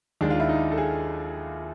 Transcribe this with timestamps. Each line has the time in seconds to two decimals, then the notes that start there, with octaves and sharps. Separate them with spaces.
0.21 D#2 D#3 G#3 D4
0.30 F4
0.40 E4
0.49 D#4
0.72 A4
0.78 G#4